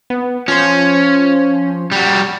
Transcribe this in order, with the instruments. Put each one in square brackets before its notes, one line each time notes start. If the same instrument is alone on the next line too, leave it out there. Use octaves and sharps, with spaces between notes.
[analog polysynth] B3
[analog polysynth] F3 C5 [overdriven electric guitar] C#4
[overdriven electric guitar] G3 F#4